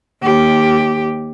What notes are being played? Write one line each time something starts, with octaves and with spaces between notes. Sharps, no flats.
D#2 G4